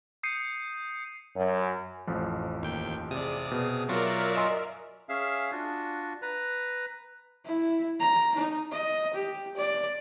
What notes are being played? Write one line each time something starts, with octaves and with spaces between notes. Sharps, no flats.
D#6 G6 C7 C#7 D#7
F#2
A1 F2 F3
D#2 G5
C3 G#4 D5 D#6
B2 G#4
F#3 F4 F#4 A#4 D5 E5
D#5 G#5 C6
C#4 G#4 E5 F5
D4 F4 F#4
B4 A#5
E4
A#5
D#4
D#5
G4
D5